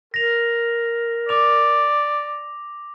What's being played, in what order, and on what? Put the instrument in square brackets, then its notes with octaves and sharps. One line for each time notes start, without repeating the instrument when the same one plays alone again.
[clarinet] A#4 [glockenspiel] A#6 F7
[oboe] D5 [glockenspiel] D6 F7